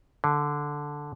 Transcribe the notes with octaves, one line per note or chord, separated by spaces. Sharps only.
D3